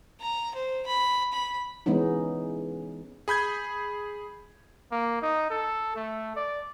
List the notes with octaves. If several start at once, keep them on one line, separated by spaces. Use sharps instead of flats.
A#5
C5
B5
B5
E3 G#3 B3 C#4 D#4
G#4 B5 G6 G#6
A#3
D#4
A4
A3
D5